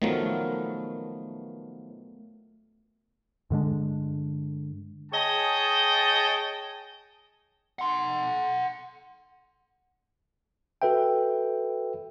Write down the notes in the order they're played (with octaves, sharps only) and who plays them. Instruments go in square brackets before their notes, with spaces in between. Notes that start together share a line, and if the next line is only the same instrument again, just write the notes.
[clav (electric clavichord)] D#3 F3 F#3 [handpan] A3 B3 A#4
[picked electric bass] G2 D3 G#3 D4
[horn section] G#4 C#5 D#5 G5 A5
[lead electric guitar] F#5 C6
[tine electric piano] F#4 A4 B4 E5 G5